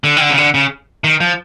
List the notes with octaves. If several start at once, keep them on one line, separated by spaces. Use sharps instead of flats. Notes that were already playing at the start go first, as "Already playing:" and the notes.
D3
D#3
D3
C#3
D3
C#3
D#3
F3